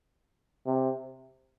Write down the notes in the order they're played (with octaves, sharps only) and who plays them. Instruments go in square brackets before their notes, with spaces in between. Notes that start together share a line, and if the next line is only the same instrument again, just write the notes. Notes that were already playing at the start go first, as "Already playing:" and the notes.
[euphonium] C3